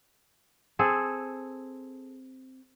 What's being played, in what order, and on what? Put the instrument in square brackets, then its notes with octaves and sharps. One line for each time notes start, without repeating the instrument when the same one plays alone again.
[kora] C4 G#4 A4